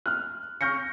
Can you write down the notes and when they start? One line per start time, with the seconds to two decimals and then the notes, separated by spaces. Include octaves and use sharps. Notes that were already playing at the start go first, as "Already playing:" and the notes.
0.06 F6 F#6
0.61 C#6 F6 G6 A#6 C#7